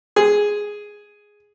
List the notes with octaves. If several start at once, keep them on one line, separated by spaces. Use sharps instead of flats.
G#4